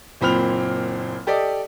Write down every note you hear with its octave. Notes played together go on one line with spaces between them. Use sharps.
F#1 A#2 C4 B5 F6 F7
G4 A4 D5 D#5